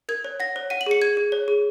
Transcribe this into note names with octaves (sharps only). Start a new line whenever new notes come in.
A#4 G#6
C#5
F#5 A#6
C#5
F#5 D#7
F#7
G#4 C#7
G#4 G#6
G#4
C#5
G#4